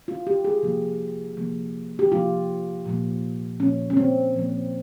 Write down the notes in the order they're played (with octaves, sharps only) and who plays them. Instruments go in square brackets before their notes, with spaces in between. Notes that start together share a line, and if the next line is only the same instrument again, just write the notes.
[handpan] F4
G4
G#4
C3 F3 A#3
C3 F3 A#3
G4
C3 F3 A#3 F4
A#2 F3 A#3
A#2 F3 A#3 C#4
C#4
C4
A#2 F3 A#3